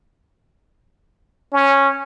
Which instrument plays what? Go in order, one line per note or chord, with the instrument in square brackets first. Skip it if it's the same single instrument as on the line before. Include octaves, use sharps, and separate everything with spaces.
[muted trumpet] C#4